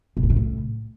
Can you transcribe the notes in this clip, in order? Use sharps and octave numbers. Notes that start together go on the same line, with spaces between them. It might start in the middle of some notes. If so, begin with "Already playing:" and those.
B2
A2
C#3
A2